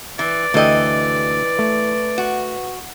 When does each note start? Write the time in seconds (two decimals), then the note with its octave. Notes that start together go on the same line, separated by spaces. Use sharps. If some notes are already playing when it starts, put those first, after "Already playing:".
0.19 E3 B4 D5
0.54 D2 E3 A4 D#5 G5
1.59 A3
2.18 F#4